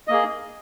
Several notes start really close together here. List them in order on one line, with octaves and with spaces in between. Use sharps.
D#5 A#3 G#4